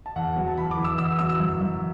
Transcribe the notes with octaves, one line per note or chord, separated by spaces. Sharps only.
A5
E2 F#5
F#3
A5
E2 B5
D6
E3
E6
E2 E6
F#3 E6
E6
F#2
F#2